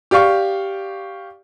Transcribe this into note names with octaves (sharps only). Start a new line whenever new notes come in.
G4 D5 F5 C#6